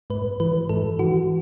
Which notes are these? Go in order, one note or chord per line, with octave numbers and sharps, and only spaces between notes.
G#2 B4
E3 B4
G#2 A4
E3 F#4